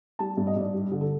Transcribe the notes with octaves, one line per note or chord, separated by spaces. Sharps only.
G3 A5
G2
D#5
G2 D5
G3
D3
A4